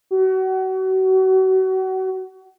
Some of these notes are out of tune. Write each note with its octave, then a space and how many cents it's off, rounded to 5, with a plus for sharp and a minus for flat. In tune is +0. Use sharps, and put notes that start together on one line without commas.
F#4 +30